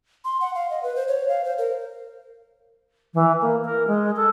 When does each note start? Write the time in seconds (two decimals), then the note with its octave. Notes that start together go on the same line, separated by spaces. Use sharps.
0.25 C6
0.41 F#5
0.55 F5
0.70 D#5
0.83 B4
0.96 C5
1.08 C#5
1.28 F5
1.44 C5
1.58 A#4
3.14 E3
3.41 A#3
3.64 A#4
3.87 G#3
4.16 A4